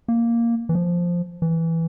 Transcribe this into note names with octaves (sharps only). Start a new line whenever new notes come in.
A#3
E3
F3
E3